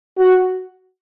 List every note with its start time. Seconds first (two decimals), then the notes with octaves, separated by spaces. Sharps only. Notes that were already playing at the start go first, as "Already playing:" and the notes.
0.18 F#4